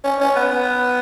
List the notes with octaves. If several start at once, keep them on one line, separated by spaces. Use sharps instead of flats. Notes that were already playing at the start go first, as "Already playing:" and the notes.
C#4
C#4
B3
B3